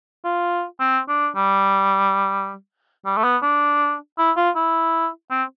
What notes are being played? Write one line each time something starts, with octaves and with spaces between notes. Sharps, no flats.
F4
C4
D4
G3
G3
A3
B3
D4
E4
F4
E4
C4